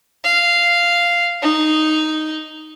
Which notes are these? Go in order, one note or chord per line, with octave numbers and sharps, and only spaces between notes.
F5
D#4